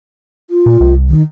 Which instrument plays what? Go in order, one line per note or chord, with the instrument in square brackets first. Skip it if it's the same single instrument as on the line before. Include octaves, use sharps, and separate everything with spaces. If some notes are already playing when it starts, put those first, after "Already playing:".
[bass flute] F4
[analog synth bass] A#2
C2
[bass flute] D#3